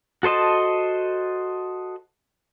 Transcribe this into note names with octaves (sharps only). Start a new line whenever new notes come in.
F#4 A4 C5 D#5 A5